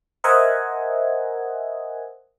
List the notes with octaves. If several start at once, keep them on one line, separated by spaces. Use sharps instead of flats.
A#4 C5 D#5 E5 F#5 G#5